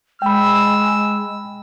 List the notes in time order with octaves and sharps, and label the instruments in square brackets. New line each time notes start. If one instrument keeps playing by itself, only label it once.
[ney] G#3 [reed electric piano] G5 B5 [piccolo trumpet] E6